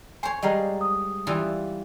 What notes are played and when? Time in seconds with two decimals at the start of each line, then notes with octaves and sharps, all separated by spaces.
0.23 C5 C#5 G#5
0.42 G3 G#3 D#5 F5 G5 A#5
0.81 D#6
1.27 E3 G3 F4